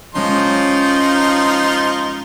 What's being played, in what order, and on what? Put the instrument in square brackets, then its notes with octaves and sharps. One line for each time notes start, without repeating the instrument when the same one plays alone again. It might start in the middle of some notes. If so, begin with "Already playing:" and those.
[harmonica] F3 D#4 C6 [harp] G#3 C#4